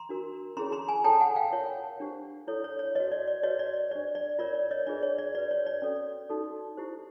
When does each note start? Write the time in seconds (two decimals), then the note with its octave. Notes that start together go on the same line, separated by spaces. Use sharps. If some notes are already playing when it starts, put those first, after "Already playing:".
Already playing: A#5 C6
0.09 D4 F#4 A#4
0.57 C#4 E4 G#4 C#5 A#5 C6
0.72 A#5 C6
0.88 G#5 A#5
1.04 F4 A4 C#5 G5 A5
1.20 F#5 G#5
1.36 F5 G5
1.53 F4 A#4 C#5
2.00 D4 G4 C5
2.47 E4 A4 C#5
2.64 C#5
2.79 C#5
2.95 F#4 B4 C#5 D#5
3.12 D5
3.28 D5
3.43 F#4 B4 C#5 D#5
3.59 D5
3.91 D4 G4 C5 D5
4.15 D5
4.39 F4 A#4 C#5 D5
4.54 D5
4.71 C#5 D#5
4.87 D4 F4 G#4 B4 D5
5.03 C#5
5.18 D5
5.35 F#4 B4 D5
5.51 C#5
5.66 D5
5.82 C#4 F#4 A4 C#5
6.30 D#4 F#4 A4
6.77 E4 G4 C5